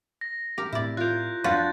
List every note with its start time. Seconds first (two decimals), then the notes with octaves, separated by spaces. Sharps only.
0.21 A#6
0.58 G4 A#4
0.73 A2 A3 C4 E4 D5
0.97 F4 A#4 F#6 G6
1.44 F2 F3 D4 F4 F#4 B4 G6 A6